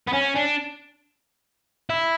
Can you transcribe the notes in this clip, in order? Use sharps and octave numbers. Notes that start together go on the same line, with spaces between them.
B3
C#4
D4
E4